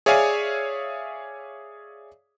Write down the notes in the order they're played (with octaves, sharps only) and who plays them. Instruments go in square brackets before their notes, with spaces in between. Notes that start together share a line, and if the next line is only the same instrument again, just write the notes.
[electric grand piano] G#4 C#5 D5 E5 F5 G#5